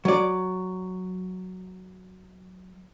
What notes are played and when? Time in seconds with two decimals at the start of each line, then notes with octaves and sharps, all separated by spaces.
0.05 F#3 D5